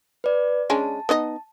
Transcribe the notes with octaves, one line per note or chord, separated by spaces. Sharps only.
B4 D5
G#3 C#4 D4 A5
B3 D#4 D#5